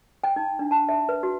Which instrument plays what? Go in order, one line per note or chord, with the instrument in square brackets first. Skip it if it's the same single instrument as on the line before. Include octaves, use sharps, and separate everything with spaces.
[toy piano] G5
D#4
D4
A5
E5
B4
F#4